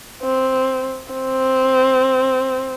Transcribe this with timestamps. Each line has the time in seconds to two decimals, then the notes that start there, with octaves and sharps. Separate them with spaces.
0.23 C4
1.13 C4